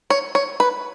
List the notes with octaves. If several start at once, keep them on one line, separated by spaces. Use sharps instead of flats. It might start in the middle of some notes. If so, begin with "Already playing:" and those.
C#5
C#5
B4